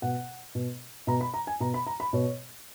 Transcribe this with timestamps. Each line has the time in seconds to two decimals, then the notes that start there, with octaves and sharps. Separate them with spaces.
0.02 B2 F#5
0.55 B2
1.07 B2 A#5
1.21 B5
1.34 A#5
1.47 G#5
1.60 B2 A#5
1.74 B5
1.87 A#5
2.00 B5
2.13 B2 C#5